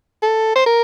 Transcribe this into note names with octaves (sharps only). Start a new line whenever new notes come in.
A4
C5
A#4